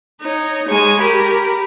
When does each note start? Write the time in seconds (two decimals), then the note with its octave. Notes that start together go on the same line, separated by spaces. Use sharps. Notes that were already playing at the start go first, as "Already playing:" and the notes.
0.21 D#4 C#5
0.69 G#3 G#5 C#6
1.00 G4 A#4 B5